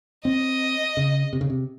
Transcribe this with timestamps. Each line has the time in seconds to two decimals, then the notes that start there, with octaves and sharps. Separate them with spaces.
0.25 C4 D#5
0.97 C#3
1.33 C3
1.41 C#3
1.50 C3